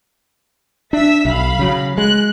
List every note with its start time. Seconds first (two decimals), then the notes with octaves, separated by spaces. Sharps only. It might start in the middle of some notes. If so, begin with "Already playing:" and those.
0.93 D4 E5 E6 B6
1.25 B1 F5 B5
1.59 C#3 F#3
1.98 G#3 F#6